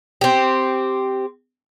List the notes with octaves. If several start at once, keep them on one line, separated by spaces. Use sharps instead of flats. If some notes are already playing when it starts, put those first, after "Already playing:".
C4 G4